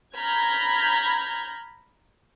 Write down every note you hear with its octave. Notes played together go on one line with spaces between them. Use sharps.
A#5 B5 F6 G6 G#6